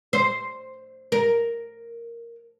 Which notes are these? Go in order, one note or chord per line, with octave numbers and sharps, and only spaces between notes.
C5
A#4